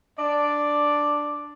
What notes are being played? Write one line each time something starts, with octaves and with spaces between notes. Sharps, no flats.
D4 D5